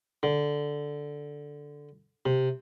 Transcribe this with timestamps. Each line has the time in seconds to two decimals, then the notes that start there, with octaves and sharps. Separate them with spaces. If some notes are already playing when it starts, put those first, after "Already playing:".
0.23 D3
2.26 C3